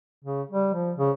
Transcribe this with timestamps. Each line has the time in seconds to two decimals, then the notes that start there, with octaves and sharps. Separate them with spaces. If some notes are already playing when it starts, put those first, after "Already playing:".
0.24 C#3
0.51 G3
0.74 F3
0.97 C#3